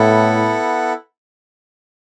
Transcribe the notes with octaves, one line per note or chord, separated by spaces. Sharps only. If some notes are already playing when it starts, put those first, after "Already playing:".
Already playing: A2 B3 E4 A4 F#5